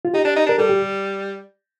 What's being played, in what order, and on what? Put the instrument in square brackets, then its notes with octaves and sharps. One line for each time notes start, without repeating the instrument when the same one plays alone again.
[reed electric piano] F4
[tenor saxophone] D#4 [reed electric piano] G4
[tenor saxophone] D4
D#4
[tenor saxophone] D4 [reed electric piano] A#4
[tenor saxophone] G3 [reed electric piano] A4
[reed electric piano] G4